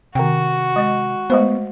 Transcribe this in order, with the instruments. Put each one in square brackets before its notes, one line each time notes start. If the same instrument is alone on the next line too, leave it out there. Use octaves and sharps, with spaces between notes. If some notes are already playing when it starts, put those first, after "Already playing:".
[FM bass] C3 [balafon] D#3 G5 [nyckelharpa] F#4
[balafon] G#3 D#5
[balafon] G#3 A3 C5 [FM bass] B3